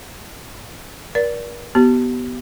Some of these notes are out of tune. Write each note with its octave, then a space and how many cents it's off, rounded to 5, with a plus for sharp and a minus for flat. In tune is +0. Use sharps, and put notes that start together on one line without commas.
A#4 +45 D5 -20
B3 +0 G4 -35